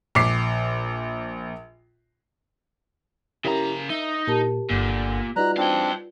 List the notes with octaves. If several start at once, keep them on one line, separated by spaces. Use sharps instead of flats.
A#1 D6 C7
C#3 C#4 E4 G4 A#4 A#5
D#4 E5
A#2 G4 A#4 A5
G1 A#2 D3 G6
G3 D#4 F4 F#4 B4 D5 A#5 F#6
C4 D4 F5 G5